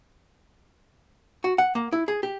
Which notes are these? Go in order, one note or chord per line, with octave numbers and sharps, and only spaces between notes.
F#4
F#5
A#3
E4
G#4
G4